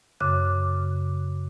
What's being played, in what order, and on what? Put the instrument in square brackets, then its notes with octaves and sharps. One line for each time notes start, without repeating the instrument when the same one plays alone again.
[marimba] F#2 C#3 D6 F#6